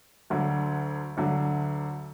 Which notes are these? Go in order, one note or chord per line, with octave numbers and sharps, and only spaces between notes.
D2 D3 F#3
D2 D3 F#3